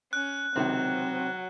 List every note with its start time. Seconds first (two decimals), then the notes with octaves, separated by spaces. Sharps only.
0.13 C#4 F#6
0.56 C#2 C3 D#3 F#3 C4